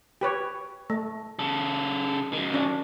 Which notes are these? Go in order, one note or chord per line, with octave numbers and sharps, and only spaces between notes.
G4 B4 C#5
A3
C#3 A4
F#2 D#3
C#4 D4